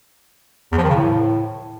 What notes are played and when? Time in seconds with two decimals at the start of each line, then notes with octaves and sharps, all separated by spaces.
0.72 E2
0.78 F3
0.84 D#3
0.89 C#3
0.95 A2